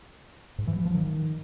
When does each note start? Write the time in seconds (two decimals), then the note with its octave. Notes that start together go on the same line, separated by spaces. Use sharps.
0.58 G#2
0.67 E3
0.76 F#3
0.85 F3
0.94 D#3